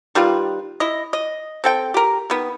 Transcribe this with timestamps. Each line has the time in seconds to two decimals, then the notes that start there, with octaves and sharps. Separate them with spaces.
0.15 D#3 G3 F4 B4
0.80 E4 D#5
1.13 D#5
1.64 C4 A4 G5
1.94 G4 A#4
2.30 D#3 B3